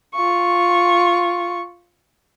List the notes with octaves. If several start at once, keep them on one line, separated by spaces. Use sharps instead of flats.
F4 C#6